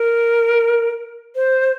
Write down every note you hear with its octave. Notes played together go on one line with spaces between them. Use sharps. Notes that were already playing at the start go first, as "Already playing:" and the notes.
Already playing: A#4
C5